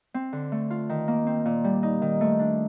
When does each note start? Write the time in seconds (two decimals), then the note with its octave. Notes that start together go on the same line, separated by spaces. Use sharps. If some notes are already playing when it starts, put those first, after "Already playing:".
0.14 C4
0.33 D3
0.52 A3
0.70 F4
0.89 D#3
1.08 A#3
1.27 C4
1.45 A#2
1.64 G3
1.83 D#4
2.02 D#3
2.21 A3
2.39 D4